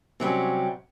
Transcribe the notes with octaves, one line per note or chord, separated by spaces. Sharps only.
C3 F#3 G3 C#4